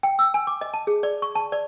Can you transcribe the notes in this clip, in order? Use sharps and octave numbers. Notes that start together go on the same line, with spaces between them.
G5
E6
G#5
D6
D#5
A5
G#4
D5
C#6
A5
D5